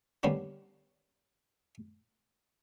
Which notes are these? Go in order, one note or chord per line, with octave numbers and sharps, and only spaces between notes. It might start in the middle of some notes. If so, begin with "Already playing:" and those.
D3 G3 A#3 B3 C#4 D4